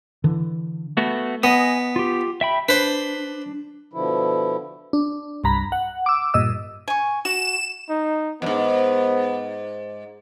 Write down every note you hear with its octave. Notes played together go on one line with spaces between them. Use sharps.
D3 E3
A3 B3 F#4
B3 D#5 G#5 D#6
F4 G4
E5 G5 B5
D4 B4 C5
B2 D3 F3 E4
D4
C2 G2 A#5 B5
F#5
D6 E6
G2 A#2 D#5 E6
G#5 C#6
F#4 E7
D#4
F2 G#2 B3